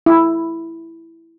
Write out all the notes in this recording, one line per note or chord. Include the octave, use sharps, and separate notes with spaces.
E4